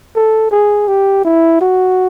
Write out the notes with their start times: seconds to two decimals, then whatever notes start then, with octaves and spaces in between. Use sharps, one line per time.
0.16 A4
0.51 G#4
0.88 G4
1.25 E4
1.61 F#4